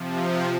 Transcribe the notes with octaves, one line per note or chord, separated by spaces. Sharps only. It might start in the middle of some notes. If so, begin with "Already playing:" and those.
Already playing: C3 F3